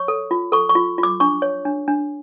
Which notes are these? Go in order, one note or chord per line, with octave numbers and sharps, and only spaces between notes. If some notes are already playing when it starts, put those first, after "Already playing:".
Already playing: C#5 C#6
A4
F4
A4 C#6
C#6
F4
F4
D6
D4 C#6
C#5
D4
D4